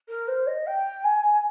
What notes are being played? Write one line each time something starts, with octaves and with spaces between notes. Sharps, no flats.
A#4
C5
D#5
G5
G#5